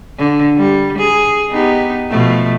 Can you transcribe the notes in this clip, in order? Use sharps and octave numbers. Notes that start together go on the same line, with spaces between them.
D3
G3
G#4
B3 D#4 G4
B2 F3 A3